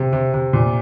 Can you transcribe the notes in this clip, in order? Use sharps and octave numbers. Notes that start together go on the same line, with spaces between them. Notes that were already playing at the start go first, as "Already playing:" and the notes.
Already playing: C3
C3
C3
A#2